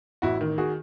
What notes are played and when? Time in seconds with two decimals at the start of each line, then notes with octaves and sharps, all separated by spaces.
0.22 A1 E4 F#4
0.41 D#3
0.58 F#4 G#4